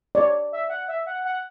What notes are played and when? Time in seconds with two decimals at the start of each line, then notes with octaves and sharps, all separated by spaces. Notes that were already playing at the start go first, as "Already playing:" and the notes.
0.15 C#5 D5
0.52 E5
0.69 F#5
0.88 E5
1.06 F#5
1.25 F#5